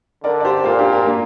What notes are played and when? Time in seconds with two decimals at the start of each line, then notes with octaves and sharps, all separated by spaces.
0.24 D3 A#4 D5
0.40 D5
0.45 G4 C5
0.65 A#2 F4 A#4
0.78 D4 G4
0.92 F4 A#4
1.05 A#3 D4